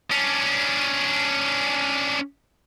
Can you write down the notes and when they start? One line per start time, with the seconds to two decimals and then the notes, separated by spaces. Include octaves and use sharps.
0.12 C#4 D4